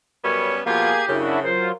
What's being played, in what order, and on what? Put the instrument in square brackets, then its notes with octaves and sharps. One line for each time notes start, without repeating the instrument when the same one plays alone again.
[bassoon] F#2 [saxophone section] G3 B3 C#4 [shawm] C#5
[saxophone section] B2 F3 F4 [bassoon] A#3 [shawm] G4 [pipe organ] G#4 G#6
[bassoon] F#2 [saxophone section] C#3 [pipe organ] D4 E4 F#4
[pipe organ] F#3 F4 [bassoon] A#4 [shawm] C5